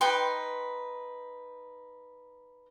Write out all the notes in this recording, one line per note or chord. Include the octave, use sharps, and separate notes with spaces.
D#4 B4 G5 C6